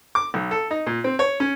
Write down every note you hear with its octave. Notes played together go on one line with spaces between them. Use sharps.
D6
B1
A4
D#4
A#2
C4
C#5
C#4